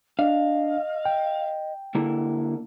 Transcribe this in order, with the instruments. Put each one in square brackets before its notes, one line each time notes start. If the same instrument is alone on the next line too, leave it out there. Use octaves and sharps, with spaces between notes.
[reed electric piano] D4 [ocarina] D#5 [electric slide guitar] F5
[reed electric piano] G5
[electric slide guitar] D3 A#3 E4